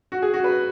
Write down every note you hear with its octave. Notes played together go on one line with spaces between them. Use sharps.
F#4
G#4
F#4
B4